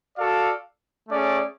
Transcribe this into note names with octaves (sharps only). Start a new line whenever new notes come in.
F#4 A4 D5 F5
A3 C#4 G#4 D5